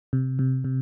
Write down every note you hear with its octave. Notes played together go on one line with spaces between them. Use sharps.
C3
C3
C3